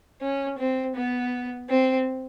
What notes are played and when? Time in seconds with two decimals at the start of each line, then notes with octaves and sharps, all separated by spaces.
0.21 C#4
0.59 C4
0.96 B3
1.69 C4